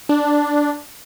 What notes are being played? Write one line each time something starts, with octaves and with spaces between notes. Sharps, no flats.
D4